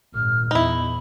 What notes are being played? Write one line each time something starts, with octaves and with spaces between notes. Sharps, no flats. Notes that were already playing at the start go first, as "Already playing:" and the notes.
G#1 A#2 F6
E2 D#4 E4 B5